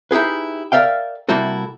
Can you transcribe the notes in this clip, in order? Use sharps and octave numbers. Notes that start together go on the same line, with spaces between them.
D#4 E4 G4 G#4 B4
A#4 D5 E5 F5 G5
C3 G3 A#3 E4 F#4 A4